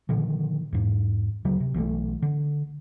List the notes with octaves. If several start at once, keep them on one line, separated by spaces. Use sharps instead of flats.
A#2 D3 D#3 F3
E2 G#2
D2 C#3 F#3
C3
B1 E3 F#3 A3
D3